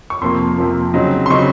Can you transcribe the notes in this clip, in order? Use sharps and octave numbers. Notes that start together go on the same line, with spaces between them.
C#6
F2 C3 F3 A#3 C6
F2 C3 F3 A#3
C#3 F#3 C4 D#4
C6
C#3 F#3 C4 D#4 C#6